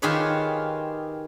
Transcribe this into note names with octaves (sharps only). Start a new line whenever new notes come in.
D#3 F4 G4 G#4 B4 C#5